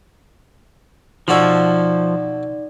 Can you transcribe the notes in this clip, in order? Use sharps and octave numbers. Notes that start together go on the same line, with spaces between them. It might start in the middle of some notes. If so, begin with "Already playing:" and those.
B2 F3 D#4 F#4 A4 D5